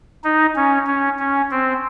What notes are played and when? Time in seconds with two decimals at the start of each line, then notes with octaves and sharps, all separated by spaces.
0.24 D#4
0.56 C#4
0.87 C#4
1.19 C#4
1.51 C4